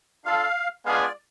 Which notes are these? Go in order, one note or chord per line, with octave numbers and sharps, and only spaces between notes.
D4 F4 A4 F5
G#3 B3 D4 F4 G#4 F5
D5